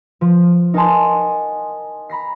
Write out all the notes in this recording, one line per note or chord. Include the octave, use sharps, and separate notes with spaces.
F3
D#4 A#4 F#5 G#5 A5 C6
A#5 B5 A#6 C7